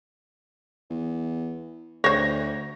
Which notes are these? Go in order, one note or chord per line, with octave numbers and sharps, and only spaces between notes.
E2
D2 C5 C#5 A#6